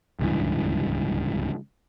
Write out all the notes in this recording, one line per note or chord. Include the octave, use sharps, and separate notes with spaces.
D1 C#2 G2 E3